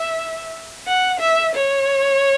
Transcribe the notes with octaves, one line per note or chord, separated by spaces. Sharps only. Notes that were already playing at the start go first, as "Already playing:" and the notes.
Already playing: E5
F#5
E5
C#5